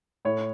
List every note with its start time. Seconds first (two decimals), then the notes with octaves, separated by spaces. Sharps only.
0.25 A2 C#5